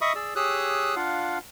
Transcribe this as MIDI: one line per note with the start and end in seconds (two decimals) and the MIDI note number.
0.01 0.13 75
0.01 0.13 76
0.01 0.13 83
0.01 0.13 85
0.01 0.13 87
0.15 0.34 68
0.15 0.34 74
0.15 0.34 88
0.36 0.95 67
0.36 0.95 68
0.36 0.95 73
0.36 0.95 87
0.36 0.95 88
0.36 0.95 90
0.96 1.38 62
0.96 1.38 65
0.96 1.38 77
0.96 1.38 78